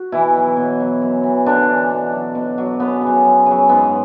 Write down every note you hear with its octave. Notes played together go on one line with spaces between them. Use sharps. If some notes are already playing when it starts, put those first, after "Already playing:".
Already playing: F#4
B2 E3 E4
F#3
B2
F#3
F#2
E3
F#2 D3 D4
E3
B2
F#3
B2
F#3
F#2 B3
C#3
F#3
F#2
C#3 F#3
G#2 B3